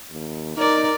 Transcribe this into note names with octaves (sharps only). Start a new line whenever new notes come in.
D#2
D#4 A#4 D5